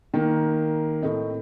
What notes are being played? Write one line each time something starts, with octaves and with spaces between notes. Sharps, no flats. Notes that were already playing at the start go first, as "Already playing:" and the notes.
D#3 A#3
A2 A3 C4 D#5